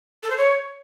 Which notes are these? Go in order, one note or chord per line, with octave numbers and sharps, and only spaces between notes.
A4
C5
C#5